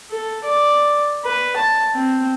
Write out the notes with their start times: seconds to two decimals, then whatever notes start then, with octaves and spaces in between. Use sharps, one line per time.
0.11 A4
0.45 D5
1.25 B4
1.57 A5
1.95 C4